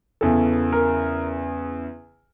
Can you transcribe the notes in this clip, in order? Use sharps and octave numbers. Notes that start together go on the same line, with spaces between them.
E2 C#3 E3 A4
A#4